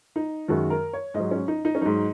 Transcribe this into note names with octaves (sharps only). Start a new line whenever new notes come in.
D#4
F#2 D#3 G#3 F#4
A#4
C#5
G#2 D#5
F#3
C#4
D#4
D#4
C#4
G#2 F#3 D#4